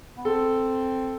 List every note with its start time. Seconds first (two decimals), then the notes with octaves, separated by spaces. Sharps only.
0.17 B3
0.25 C4 A4